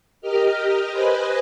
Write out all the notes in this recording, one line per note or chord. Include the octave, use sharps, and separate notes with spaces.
G4 A#4 D#5 F6
B4 C5 D#5 G#5 B5 F#6